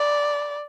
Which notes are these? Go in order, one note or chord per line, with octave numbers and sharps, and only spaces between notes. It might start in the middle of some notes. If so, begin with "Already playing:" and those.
Already playing: D5